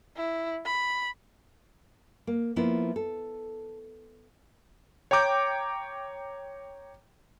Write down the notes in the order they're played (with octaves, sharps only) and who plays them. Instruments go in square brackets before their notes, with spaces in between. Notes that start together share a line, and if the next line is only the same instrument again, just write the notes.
[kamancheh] E4
B5
[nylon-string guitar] A#3
F3 A#3 B3 E4
A4
[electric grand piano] C#5 G5 A#5 D6 G6